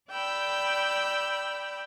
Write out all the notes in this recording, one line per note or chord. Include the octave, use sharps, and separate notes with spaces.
D5 G5 B5 E6